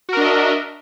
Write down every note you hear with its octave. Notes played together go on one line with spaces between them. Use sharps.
D4 F#4 A#4 D#5 E5